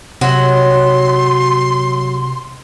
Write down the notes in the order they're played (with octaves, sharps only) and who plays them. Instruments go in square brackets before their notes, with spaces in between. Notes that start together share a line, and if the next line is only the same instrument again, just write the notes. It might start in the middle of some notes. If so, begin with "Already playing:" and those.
[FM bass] C3 [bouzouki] F#3 [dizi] C6